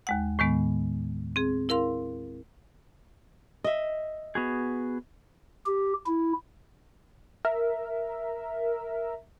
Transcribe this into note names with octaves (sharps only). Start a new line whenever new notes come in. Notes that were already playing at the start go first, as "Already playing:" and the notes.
D#2 G#3 F#5
A2 D#3 G#3 B3
C4 G#4
E4 A#4 F5 C6
D#5 E5
B3 F#4 G#4
G4
E4
A#4 E5